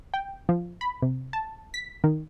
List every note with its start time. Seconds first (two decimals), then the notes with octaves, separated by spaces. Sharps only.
0.14 G5
0.49 F3
0.81 B5
1.02 C3
1.33 A5
1.74 B6
2.04 D#3